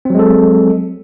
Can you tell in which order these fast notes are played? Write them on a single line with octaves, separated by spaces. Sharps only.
C4 F#3 G#3 A4